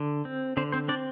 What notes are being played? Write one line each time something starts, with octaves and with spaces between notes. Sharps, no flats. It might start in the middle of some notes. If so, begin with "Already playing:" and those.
Already playing: D3
C4
D3 C4 C5
C4 C5
C4 D4 D5